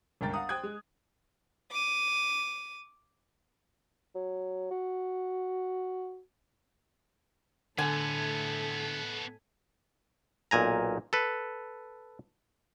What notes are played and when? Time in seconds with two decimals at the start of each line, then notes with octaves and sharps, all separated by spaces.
0.21 G1 C#2 A#4 G5 A6
0.33 F5 F#5 A#5 D#6
0.49 C5 G5 D#6 F#6 G#6
0.63 G#3
1.71 D6 D#7
4.15 F#3
4.71 F#4
7.78 A2 D3 A3 B3 A4 G#5
10.51 B1 A#2 G#5 A#5
11.13 A4 B4